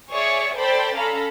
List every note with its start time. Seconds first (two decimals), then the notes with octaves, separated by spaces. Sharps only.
0.11 G#4 C#5 D5 E5 C#6
0.57 A4 C5 D5 G5 A5 B5
0.96 C#4 A4 F5 A#5 B5